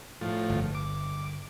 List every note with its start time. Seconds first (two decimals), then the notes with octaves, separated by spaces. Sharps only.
0.21 A2 F3
0.50 G1
0.75 D6